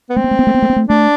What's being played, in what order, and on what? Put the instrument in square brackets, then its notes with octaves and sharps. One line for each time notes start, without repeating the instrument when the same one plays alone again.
[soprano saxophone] B3
[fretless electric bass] A3 [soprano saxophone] C4
[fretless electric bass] B3
A3
B3
A3
B3
A3
B3
A3
[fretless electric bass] A3 [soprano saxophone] D4